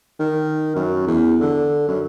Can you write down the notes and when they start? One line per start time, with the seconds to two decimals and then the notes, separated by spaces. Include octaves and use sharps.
0.19 D#3
0.75 F#2
1.07 E2
1.40 D3
1.88 F#2